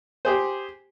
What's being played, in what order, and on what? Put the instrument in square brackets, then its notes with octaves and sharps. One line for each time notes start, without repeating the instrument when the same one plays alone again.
[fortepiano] G4 G#4 C5